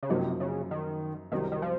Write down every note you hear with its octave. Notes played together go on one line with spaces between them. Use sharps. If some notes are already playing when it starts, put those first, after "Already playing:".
C#3
F#2 C3 F3 A#3 D#4 F#4
C#3
D#3
C2 C3 D#3 F#3 C4
D#3
F3